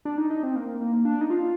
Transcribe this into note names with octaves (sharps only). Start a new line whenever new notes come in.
D4
D#4
D#4
C4
A#3
A#3
D4
D#4
F4